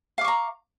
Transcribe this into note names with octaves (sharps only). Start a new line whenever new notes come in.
F5 A#5 C#6 D6